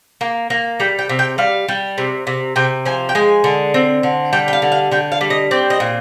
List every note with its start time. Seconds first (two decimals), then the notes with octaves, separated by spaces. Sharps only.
0.21 A#3
0.50 A#3
0.80 G3 G5
0.99 G5
1.09 C3
1.19 G5
1.38 G3 F5
1.68 G3
1.98 C3
2.27 C3
2.56 C3 G5
2.86 F3 G#5
3.09 G5
3.15 G#3 G#5
3.44 D3
3.74 C4
4.03 D3
4.33 G3 G5
4.48 G5
4.53 F5
4.62 D3
4.72 F5
4.91 D3 G5
5.12 F5
5.21 G3
5.30 D#5
5.51 C4 D5
5.70 D#5
5.80 A#2